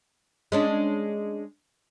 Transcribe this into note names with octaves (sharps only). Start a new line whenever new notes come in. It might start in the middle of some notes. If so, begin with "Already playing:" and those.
G#3 C#4 D4